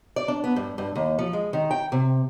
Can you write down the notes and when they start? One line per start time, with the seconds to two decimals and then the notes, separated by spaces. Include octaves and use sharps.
0.16 D5
0.28 D4
0.44 B3
0.56 G2
0.78 G2
0.95 D#2
1.19 F3
1.33 G#3
1.53 D#3
1.71 G5
1.92 C3